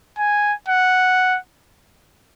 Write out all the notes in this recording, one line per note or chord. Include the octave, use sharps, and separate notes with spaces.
G#5
F#5